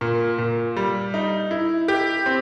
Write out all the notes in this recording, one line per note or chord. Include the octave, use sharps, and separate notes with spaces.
A#2
A#2
G3
D#4
E4
G4
C4